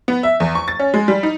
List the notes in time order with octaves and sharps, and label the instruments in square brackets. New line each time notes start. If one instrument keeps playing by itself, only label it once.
[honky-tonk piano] B3
E5
E2
C#6
A6
C#4
G#3
G3
D#4